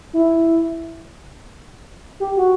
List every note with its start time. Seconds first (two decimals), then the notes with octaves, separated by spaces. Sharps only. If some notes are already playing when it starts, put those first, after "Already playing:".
0.13 E4
2.20 G4
2.37 F#4